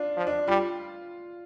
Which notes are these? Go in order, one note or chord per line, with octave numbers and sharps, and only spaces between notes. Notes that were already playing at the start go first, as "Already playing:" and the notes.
Already playing: D4 F4
F3
D4
G3 F4